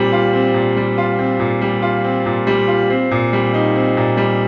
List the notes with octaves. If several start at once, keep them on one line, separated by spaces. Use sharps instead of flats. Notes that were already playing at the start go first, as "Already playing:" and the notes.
Already playing: A#2 G3 C4
F4
C4
A#2
G3
F4
C4
A#2
G3
F4
C4
A#2
G3
F4
C4
A#2
G3
D#4
C4
A#2
G3